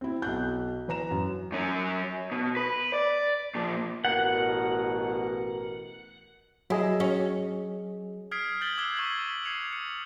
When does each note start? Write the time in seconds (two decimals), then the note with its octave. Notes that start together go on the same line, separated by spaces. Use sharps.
0.01 C4 E4
0.22 B1 F#6 G6
0.88 E3 B4 A#5 E7
1.11 F#2
1.52 F#2 C#4
2.32 B2
2.57 B4
2.93 D5
3.55 A#2 F3
4.05 A1 B2 A#4 F#5
6.70 F#3 E4 G#4 D#5
7.00 C#4 F#4
8.31 D#6 F6 G#6 B6 C7 D7
8.61 F6 G6 A6 F#7 G7
8.78 D6 E6 F#6 G#6 F#7 G7
8.97 C#6 E6 G#6 B6 F#7
9.45 G#6 C7 C#7 F7
9.73 C#7